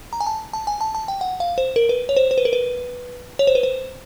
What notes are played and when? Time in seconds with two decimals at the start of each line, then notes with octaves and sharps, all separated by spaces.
0.13 A#5
0.21 G#5
0.27 A5
0.53 A5
0.67 G#5
0.81 A5
0.95 A5
1.08 G5
1.21 F#5
1.40 F5
1.58 C5
1.76 A#4
1.89 B4
2.09 C#5
2.17 C5
2.31 C5
2.38 B4
2.45 A#4
2.53 B4
3.39 C#5
3.47 C5
3.55 B4
3.63 C5